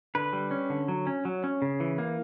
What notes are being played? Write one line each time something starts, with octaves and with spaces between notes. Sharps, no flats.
D3 B4
G3
C#4
D3
F#3
C#4
F#3
C#4
C#3
E3
A#3